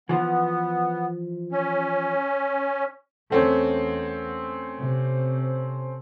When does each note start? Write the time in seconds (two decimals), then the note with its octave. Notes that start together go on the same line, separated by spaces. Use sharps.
0.09 E3 F3 B3
1.52 C#4
3.30 E2 A3 C4 C#4
4.78 C3